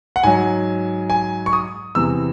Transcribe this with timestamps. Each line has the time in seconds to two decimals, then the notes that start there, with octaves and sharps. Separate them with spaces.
0.16 F#5
0.23 G#2 F#3 G#5
1.10 G#5
1.46 C#6
1.53 D#6
1.95 E2 C3 E3 E6